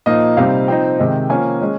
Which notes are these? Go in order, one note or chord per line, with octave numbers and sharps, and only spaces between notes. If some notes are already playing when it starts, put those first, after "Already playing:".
A#2 F3 A#3 D#4 D#5
C3 G3 C4 D#4 F5
F3 C4 D#4 G5
C3 D#3 G#3
F3 A#3 C#4 G#5
G#3 C#4